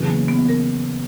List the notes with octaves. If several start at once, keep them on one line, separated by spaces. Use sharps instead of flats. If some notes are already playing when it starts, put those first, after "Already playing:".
Already playing: E2 C#3 F#3 C#4 G#4
A#3
B3
A#4